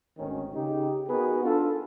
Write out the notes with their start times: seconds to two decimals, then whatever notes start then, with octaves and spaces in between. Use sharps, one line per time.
0.18 G#1 D2 D#3 C#4
0.54 C#3 D#4 G4
1.08 B3 D#4 F#4 G#4 A#4 B4
1.43 D4 F4 A4